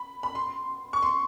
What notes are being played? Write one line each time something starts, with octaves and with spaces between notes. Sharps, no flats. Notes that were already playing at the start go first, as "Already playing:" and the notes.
Already playing: B5
B5
C6
C#6
C6